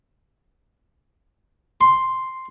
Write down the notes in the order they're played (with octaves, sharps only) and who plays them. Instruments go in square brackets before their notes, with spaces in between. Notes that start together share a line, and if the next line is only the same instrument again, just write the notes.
[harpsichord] C6